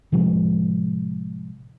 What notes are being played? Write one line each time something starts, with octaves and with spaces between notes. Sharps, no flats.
A2 C3 F3 G#3